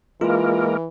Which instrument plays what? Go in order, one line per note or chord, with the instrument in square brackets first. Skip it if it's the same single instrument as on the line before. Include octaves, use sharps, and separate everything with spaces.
[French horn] E3 [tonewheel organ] G#3 A#3 A#4 [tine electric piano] F4